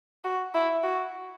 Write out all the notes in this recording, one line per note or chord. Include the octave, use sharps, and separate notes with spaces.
F#4
E4
F#4